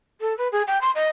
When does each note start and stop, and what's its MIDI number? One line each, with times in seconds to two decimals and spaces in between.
0.20 0.35 69
0.37 0.47 71
0.52 0.62 68
0.67 0.78 79
0.81 0.90 84
0.95 1.08 75